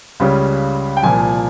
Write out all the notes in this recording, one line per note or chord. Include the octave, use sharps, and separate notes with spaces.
C#2 C#3 G3 C#4
G5
C2 A#2 F3 G#5